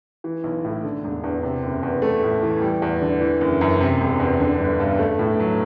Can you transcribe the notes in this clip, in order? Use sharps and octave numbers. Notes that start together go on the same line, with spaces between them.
E3
B1
A2
D3
E1
E2
C3
F#1
E2
A3
A2
E3
G3
E2
D3
E3
F#1
F#2
C3
E1
E2
D3
G1
G2
A3
A2
F#3